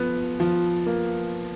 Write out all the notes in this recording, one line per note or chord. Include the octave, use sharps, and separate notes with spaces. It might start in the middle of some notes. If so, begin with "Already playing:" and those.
Already playing: F3 B3
F3
A#3